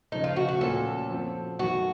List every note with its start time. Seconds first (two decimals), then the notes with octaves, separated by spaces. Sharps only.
0.12 C#3 F3 A3 D#4
0.24 F4
0.36 F#4
0.48 F#4
0.61 A#2 F3 A#3 C#4 F#4 A4
1.11 F3 C4 F#4
1.59 F#2 D#3 A3 F#4